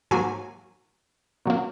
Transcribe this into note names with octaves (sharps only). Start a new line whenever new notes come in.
G#2 F#3 A#3 G#5
A#2 F#3 A#3